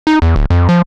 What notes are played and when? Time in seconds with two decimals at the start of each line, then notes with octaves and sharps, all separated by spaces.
0.07 D#4
0.22 E2
0.36 D1
0.50 F2
0.69 F3